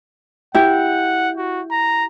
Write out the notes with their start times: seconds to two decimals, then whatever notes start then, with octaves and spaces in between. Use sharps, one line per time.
0.55 E4 G4 F#5
1.37 F#4
1.71 A#5